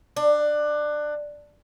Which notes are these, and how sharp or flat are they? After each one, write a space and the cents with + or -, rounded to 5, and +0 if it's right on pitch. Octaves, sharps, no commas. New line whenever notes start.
D4 +20